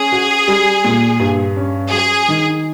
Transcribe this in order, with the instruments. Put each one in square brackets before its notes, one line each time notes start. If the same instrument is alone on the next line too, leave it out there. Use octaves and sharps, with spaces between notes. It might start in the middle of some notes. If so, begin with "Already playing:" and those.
Already playing: [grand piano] C#4 [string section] G#4
[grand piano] F#4
G3
A#2
G2
C#4
[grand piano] F#3 [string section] G#4
[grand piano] D#3